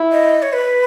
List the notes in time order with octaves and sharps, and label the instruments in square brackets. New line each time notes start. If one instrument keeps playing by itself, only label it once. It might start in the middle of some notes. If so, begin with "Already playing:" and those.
Already playing: [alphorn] E4
[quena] D#5
C#5
B4